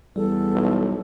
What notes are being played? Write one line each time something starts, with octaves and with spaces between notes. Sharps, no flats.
E2 G3 A4
B1